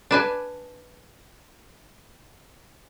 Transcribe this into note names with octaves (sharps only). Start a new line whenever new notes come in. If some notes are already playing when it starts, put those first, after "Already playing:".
D4 B4 G#5